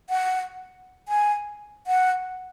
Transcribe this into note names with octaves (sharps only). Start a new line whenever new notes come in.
F#5
G#5
F#5